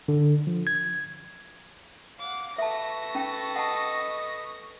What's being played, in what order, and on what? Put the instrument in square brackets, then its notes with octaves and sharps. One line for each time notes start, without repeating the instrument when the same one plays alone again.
[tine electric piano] D3
F3
G#6
[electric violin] F5 F#5 [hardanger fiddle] D6
[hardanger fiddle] A4 B4 [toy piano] E5 A5 [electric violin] C#6 A#6
[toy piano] C#4 G5
[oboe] D#5 [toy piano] F#5 A5